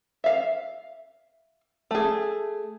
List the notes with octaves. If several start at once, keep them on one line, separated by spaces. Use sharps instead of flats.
E5 F5
A3 G#4